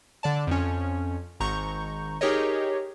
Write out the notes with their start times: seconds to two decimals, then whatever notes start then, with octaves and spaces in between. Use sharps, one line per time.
0.23 D3 D5 A5
0.47 F2 C#4
1.40 G#1 A#5 C#6 G6
2.21 D#4 G4 G#4 A#4 C#5 D#5